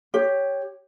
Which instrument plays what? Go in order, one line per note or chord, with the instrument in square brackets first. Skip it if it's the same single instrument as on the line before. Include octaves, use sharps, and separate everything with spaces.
[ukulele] G4 C#5